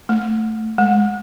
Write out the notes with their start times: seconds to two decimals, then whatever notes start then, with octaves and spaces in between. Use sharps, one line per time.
0.09 A3
0.78 G#3